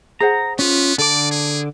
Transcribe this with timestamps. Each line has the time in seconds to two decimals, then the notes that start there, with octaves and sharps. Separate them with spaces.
0.20 G#4 C5 F#5 A#5
0.59 B3 C#4 F4
0.98 D3 A4 D5 D6
1.31 G#4